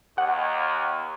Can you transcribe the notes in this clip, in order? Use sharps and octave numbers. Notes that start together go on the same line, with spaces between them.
D#2 F#5